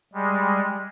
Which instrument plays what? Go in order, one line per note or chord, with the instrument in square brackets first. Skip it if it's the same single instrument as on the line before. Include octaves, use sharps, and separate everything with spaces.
[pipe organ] G3 G#3